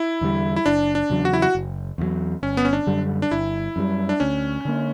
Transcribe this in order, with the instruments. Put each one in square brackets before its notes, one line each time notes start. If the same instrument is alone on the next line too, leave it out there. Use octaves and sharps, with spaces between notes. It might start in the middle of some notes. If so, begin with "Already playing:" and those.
Already playing: [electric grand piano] E4
[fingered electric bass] E2 D3 G3
[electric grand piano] E4
[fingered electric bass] F#1 [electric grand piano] D4
[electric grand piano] D4
[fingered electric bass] E2 C#3 F#3
[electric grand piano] F#4
E4
F#4
[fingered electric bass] F#1
E2 C#3 F#3
[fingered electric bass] G1 [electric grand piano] C#4
[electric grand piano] B3
C#4
D4
[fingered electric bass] F#2 D3 G3
[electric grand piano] D4
[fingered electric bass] G1 [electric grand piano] E4
[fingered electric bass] F#2 D3 G3
[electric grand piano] D4
[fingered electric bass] D2 [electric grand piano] C#4
[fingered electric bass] D3 A#3